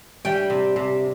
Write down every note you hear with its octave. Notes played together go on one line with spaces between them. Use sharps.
G3 G5
C3
C3